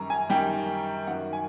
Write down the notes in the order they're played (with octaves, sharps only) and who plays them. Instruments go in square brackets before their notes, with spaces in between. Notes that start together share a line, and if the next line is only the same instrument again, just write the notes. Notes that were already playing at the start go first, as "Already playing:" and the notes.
Already playing: [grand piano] F#2 D#3 G3 A#5
G#5
F#2 D#3 G3 G5
F#2 D#3 F#3 F#5
G#5